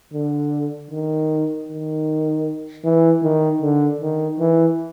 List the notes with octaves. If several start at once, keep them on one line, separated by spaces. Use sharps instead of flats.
D3
D#3
D#3
E3
D#3
D3
D#3
E3